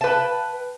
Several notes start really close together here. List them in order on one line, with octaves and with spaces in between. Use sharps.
A5 B4 G5